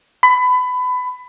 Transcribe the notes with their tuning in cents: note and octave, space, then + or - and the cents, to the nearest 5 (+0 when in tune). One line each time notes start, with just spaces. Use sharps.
B5 +25